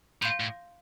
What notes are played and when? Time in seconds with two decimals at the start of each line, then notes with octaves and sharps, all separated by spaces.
0.22 A2 F5 C6 G6
0.40 A2